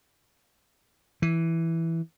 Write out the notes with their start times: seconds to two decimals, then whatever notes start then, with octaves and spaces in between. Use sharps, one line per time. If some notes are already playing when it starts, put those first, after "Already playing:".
1.22 E3